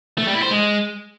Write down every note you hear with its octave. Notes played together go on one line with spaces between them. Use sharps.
A3
G3
E4
C5
G#3